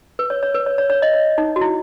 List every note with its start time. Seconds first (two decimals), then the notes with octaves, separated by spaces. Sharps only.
0.19 B4
0.30 C#5
0.43 C#5
0.54 B4
0.66 C#5
0.78 C#5
0.90 C#5
1.02 D#5
1.14 C#5
1.38 D#4
1.56 F#4
1.61 E4